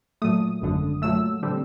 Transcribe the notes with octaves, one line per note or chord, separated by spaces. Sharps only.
A#2 F#3 A3 D#6
G#1 F#2 D3
A#2 F#3 A3 E6
D3 G3 C4